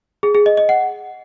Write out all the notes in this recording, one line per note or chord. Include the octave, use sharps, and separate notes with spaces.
G#4
G#4
D#5
D#5
F#5